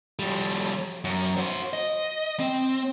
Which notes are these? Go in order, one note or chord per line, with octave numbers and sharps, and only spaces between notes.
F3 G3
F#2
F#4 C5
D#5
C4